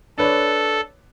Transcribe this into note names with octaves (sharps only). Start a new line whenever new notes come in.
D4 A4 B4 C#5